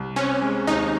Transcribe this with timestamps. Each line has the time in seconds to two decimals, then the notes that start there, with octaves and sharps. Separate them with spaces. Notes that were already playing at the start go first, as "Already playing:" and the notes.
Already playing: C2
0.16 C4 C#4
0.42 G#3
0.67 D#2 D#4